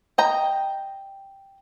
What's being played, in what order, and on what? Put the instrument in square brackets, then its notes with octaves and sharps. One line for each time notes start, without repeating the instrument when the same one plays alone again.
[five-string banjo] D#5 G5 A#5